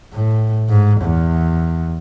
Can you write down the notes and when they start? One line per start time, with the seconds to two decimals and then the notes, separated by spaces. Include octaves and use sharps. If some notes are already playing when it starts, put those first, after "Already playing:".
0.13 A2
0.69 G#2
1.01 E2